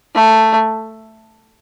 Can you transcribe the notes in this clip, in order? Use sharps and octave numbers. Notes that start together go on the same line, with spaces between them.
A3